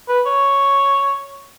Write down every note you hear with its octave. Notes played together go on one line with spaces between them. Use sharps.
B4
C#5